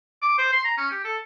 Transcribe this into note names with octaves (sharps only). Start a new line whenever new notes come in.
D6
C5
C6
A#5
C#4
G4
A4